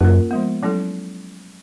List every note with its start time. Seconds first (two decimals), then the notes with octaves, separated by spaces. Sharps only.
0.01 F#2 A#3 C#4 F4 A#4
0.31 F3 G#3 B3
0.63 F#3 A3 C#4 E4 A4